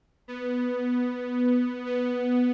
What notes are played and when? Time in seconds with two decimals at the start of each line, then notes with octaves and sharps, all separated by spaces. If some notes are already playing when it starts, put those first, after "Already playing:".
0.28 B3
1.86 B3